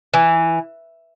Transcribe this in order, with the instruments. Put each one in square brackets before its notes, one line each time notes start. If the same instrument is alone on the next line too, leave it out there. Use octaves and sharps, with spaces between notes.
[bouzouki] E3